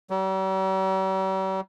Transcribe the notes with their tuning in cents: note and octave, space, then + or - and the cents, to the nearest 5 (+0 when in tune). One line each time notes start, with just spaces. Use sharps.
G3 -45